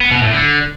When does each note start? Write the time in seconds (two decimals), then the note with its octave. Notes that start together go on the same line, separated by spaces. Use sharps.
0.01 B3
0.11 B2
0.22 A2
0.33 D3